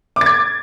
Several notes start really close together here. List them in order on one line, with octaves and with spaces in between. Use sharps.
D6 A6 G#6